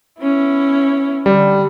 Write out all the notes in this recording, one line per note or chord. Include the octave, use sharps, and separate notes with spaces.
B3 C#4 E4
D3 G3